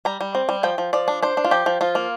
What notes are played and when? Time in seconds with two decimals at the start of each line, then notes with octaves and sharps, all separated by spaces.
0.05 G3 A#5
0.21 G3
0.35 C4
0.49 G3
0.63 F3 G5
0.78 F3
0.93 F3 D5
1.08 D4
1.22 D4 C5
1.37 D4
1.44 F4
1.51 F3 G4
1.66 F3
1.81 F3 F4
1.95 A#3